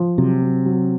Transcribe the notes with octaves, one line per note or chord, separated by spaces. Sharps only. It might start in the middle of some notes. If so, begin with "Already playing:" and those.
Already playing: F3
C3 F#3
F#3
F#3